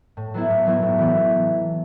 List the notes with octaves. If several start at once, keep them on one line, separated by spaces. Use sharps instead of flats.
A2
F#3 B3 E4
A2
F#3 B3 E4
A2
E3 B3